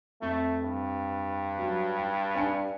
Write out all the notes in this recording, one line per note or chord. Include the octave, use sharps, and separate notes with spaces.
F2 A3
G2
F#3
G5
D4 G#5 C#7